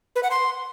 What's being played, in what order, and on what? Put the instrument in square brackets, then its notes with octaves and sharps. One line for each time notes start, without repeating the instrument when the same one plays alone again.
[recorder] B4
F#5
C6